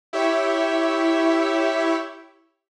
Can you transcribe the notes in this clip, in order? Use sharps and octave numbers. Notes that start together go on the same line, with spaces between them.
E4 G4 C#5 E5